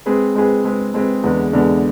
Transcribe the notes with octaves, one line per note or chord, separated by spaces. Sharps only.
G#3 C4 G#4 B4
G#3 C4 G#4 B4
G#3 C4 G#4 B4
G#3 C4 G#4 B4
E2 D3 G#3 B3
E2 D3 G#3 B3